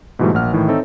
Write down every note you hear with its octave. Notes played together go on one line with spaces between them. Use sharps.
G#2 B2 E3 F#3 G3 A3
A#1 A#3 F#5 F6
A2 D#3 E3
C4 D#4 A4 C5 C#5 E5